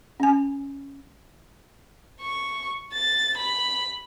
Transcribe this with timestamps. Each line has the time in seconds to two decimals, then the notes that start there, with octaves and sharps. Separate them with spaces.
0.20 C#4 G#5
2.22 C#6
2.93 A6
3.38 B5